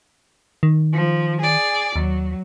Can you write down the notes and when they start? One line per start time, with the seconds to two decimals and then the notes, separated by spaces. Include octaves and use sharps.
0.63 D#3
0.93 F3
1.40 G#4 D5
1.96 D#2 F#3